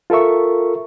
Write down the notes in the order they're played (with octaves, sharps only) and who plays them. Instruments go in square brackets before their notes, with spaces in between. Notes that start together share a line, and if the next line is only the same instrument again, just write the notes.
[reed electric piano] F4 A4 A#4 E5 C#6